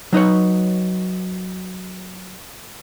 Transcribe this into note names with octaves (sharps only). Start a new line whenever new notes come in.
F#3 D#4 B4 C#5